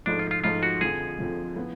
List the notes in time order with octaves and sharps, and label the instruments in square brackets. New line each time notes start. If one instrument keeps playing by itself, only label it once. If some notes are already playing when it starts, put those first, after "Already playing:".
[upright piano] G#2 F3 A3 [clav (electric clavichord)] D4
[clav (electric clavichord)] F4
F4
[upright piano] G#2 F3 A3 [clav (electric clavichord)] F4
[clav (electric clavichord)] F#4
[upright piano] F2 D3 F3 [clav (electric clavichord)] G#4
[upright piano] F2 D3 F3
A2 F3 B3 F4